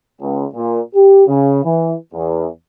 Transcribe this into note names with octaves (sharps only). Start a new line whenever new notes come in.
C#2
A#2
G4
C#3
E3
E2